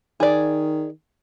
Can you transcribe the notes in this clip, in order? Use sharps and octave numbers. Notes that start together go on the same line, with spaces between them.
D#3 G#4 D5